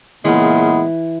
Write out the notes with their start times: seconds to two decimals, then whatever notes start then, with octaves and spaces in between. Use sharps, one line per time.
0.25 A#2 C#3 E3 G#3 B3